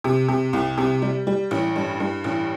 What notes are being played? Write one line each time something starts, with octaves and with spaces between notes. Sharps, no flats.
C3
C3
C2
C3
G3
G3
A1
G2
G2
A1